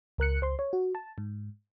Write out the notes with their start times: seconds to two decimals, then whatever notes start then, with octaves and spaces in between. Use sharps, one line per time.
0.18 C#2 A#4 F#6 C#7
0.41 C#2 C5 C6
0.59 C#5
0.73 F#4
0.95 A5
1.18 G#2